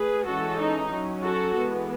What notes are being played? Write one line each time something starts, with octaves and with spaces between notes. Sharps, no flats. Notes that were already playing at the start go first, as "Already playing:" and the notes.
Already playing: A3 G#4 B4
E3 G#3 C#4 F#4 A4
D#4
F#3 C#4
F#4 A4
E3 G#3 B3